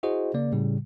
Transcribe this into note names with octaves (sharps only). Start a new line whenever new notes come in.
E4 F#4 G#4 C5 D#5
C#3 A#3 D5
A2 C#3 G3